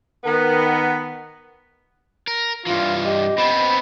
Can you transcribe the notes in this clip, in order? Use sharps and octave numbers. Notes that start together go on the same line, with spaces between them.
D#3 B3
A#4
G2 E3 F4
G4 D#5
B3 C4 B5